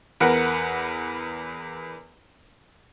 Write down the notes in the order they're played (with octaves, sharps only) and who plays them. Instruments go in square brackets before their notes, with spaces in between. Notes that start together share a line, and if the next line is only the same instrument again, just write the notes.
[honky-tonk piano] E2 A#4 B4 F#5